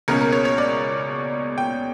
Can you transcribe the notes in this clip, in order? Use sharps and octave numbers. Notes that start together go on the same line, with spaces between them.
C#2 B2 A#3 C#4 A#4
A#4
C#5
C#5
D5
G5